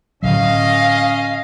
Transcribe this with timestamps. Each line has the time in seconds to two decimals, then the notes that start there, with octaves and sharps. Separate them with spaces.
0.23 A2 D3 F#3 C#4 D#5 F5